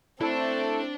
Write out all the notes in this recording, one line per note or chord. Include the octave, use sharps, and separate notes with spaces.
A3 C4 D4 E4 A4